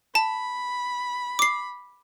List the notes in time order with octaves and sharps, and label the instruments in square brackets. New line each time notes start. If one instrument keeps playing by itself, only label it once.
[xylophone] A5 [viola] B5
[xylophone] D6 C7